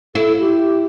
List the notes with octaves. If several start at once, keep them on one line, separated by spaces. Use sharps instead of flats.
E4 A4
G4